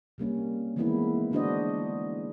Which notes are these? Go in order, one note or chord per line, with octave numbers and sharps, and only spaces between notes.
C3 G3 A#3 C#4
D#3 E3 G#3 A#3 B3 E4
D3 G#3 D4 F#4 C5 D#5